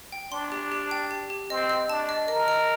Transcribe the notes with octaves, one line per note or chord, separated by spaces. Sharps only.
G5
D4 C6
G4
G4
G5
G4
G4
C4 D#5
D#5
D4 A5
D#5
A#4 D#5
D#5